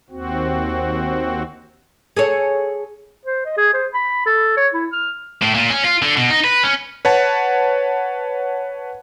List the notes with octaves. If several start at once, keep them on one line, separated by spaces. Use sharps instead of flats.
D#2 C4 F#4
G#4 A4 C#5
C5
D#5
G#4
C5
B5
A4
C#5
E4
F6
A2
A#2
C#4
F4
D3
B2
D#4
B4
C#4
B4 C#5 F#5 A5